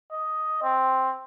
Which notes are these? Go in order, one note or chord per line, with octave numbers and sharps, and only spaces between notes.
D#5
C4